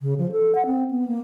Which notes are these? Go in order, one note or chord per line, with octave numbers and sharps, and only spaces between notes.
C#3
F3
A4
F#5
C4
B3
A#3